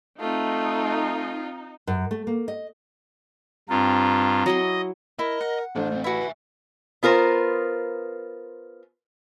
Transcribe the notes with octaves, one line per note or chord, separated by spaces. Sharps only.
A3 C4 D#4 F4
F#2
A3
A#3
D#5
G2 C4 F4 A#5
F#3 E4 D#5 C6
E4 A#4 D#5
F#5
A1 D4 C5
A3 C4
E4 F#4 B4 E5 G#5
B3 F4 A#4 C5